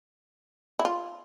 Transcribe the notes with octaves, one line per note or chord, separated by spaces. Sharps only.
E4
F4